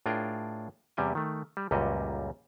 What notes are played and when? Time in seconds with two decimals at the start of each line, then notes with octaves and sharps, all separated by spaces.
0.06 A2 D4 F4 G#4 A#4 G5
0.97 E2 C3 G3 C#4 G5 G#5
1.15 D#3 A3
1.57 G3
1.71 C#2 F#2 A#2 G3 F#4 D#5